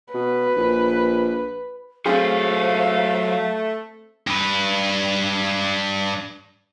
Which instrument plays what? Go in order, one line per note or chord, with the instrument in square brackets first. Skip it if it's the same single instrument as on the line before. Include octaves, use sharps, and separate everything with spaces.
[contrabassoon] B2 [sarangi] B4
[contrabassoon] A#1
[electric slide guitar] F#3 C5 [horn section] A3 [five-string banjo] C4 G#4 [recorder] F5
[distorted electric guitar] G2 B4